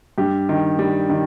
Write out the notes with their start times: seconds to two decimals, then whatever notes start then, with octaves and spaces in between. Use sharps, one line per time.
0.18 G2 G4
0.49 D#3
0.79 G3
1.10 D#3